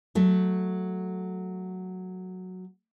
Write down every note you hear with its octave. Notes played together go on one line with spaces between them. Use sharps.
F#3 A3